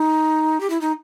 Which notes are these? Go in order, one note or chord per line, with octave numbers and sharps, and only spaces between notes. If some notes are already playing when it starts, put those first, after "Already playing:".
Already playing: D#4
G4
E4
D#4